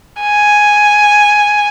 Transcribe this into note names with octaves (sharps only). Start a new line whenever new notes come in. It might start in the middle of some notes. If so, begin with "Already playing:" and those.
G#5